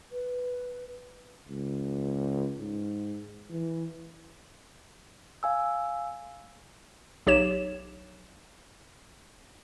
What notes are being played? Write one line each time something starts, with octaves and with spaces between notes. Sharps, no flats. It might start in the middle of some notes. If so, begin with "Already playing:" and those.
B4
C#2
G#2
E3
F5 G#5 E6
B1 G4 C#5 E7